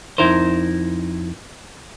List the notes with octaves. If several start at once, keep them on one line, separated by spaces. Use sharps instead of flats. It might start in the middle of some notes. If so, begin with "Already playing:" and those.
F2 C#3 D#4 E4 A#4 C5